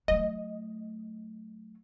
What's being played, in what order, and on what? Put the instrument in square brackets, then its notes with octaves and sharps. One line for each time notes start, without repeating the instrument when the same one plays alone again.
[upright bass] F#3 A3 [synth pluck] D#5